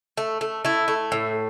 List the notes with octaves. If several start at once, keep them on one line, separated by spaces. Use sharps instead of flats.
A3
A3
A3 E4
A3
A2